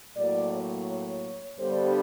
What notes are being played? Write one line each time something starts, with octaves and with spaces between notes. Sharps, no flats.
A2 F#3 A#3 D5
C#5
G2 D3 G3 B3 C5